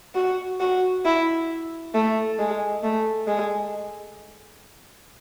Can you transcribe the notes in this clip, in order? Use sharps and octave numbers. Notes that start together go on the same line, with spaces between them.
F#4
F#4
E4
A3
G#3
A3
G#3